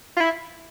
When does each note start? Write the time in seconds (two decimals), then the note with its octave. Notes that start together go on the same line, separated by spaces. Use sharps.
0.17 F4
0.20 E4